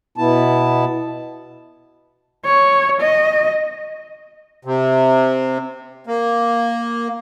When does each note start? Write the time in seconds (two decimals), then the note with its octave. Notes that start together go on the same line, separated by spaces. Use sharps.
0.18 B2 B3 E4 A5
2.45 C#5
3.00 D#5
4.65 C3
6.07 A#3